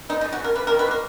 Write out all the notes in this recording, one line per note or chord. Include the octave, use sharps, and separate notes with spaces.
G#3 D#4
D#4
C#3
F#4
C#3 A#4
A#3 B4
A#4
D#3
B4
A#3 A#4